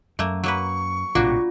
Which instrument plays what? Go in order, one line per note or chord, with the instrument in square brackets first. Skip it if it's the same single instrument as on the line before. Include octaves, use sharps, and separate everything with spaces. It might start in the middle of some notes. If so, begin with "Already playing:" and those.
[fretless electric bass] F#2 [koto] A3 A#3
[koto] F#3 A#3 B4 [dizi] C#6
[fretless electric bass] A#1 A2 C3 [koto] A#3 D4 F#4 [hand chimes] F4